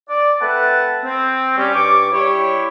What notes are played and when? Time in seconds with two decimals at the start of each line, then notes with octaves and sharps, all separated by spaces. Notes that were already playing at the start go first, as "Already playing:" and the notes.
0.09 D5
0.41 A3 C4 B4 F#5 A5
1.03 C4
1.57 G3 C#4 G4
1.74 G2 D5 C#6 D6
2.12 G3 E4 G4 C#5